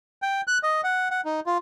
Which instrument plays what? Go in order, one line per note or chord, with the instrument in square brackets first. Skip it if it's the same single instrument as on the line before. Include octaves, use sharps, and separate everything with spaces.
[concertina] G5
F#6
D#5
F#5
F#5
D#4
F4